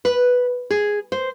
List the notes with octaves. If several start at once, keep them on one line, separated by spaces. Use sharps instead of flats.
B4
G#4
C5